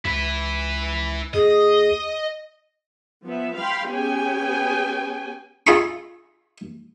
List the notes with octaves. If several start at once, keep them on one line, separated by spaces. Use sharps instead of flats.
C#2 E4 B4
D#2 G#4 D#5
F3 B3 E5
F5 G5 B5 C6
B3 C#4 G4 G#4 G5 G#5
F4 G#4 E5 A#5 B5 C#6